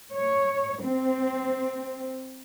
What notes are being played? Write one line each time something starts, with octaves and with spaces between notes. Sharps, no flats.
C#5
C4